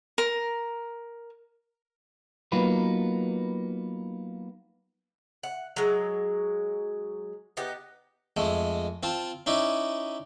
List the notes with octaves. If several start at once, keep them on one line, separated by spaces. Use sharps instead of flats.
A#4
F#3 A#3 B3 D#4 F4 B4
F#5
F#3 G#3
B3 D#4 G4
F2 G#3 A3
C4 F4 A5
C#4 D#4 E4 D5